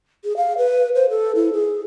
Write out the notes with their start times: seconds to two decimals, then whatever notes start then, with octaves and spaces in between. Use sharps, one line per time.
0.25 G#4
0.37 F5
0.58 B4
0.95 C5
1.10 A4
1.35 E4
1.53 G#4